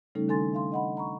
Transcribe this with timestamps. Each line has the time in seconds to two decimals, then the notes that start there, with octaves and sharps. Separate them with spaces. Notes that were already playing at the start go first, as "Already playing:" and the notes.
0.15 C#3 G3 A3 C#4 D#4 A4
0.28 D#3 D4 A4 G#5 C6 A6
0.53 E5 F5 C6
0.72 D#5 F#5 B5
0.97 A#5 B5 C#6